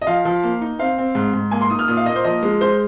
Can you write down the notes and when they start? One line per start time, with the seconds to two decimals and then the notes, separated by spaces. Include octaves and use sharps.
0.02 D#5
0.07 F3 F5
0.25 F3
0.43 A#3
0.61 D#4
0.79 C4 F5
0.98 C4
1.15 G#2
1.33 G#2
1.51 A#3 G#5
1.61 C6
1.70 D#4 D#6
1.79 F6
1.88 A#2 D#6
1.97 F5
2.06 A#3 D#5
2.16 C5
2.25 F3 D#5
2.43 G#3
2.61 G#3 C5